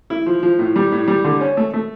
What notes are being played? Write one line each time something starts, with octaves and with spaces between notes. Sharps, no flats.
E4
F3
F3
A2
G3
A2
G3
D3
C#4
A3
A3